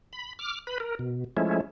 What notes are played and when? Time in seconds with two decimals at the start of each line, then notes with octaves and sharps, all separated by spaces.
0.13 B5
0.39 D6 F6
0.67 B4 B5
0.80 A#4
0.99 B2
1.37 F3 G#3 A3 C#4 E4